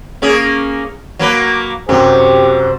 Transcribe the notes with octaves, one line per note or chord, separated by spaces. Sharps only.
A#3 C#4 G#4
F#3 A#3 B4
F#2 C3 F#3 G4 C5